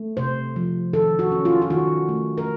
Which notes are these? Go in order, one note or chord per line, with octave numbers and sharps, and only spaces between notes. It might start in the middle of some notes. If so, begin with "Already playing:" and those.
Already playing: A3
C3 C5
F3
D#3 A4
F#4
C#4
F4
F4
D#3 F#4
A3
A#4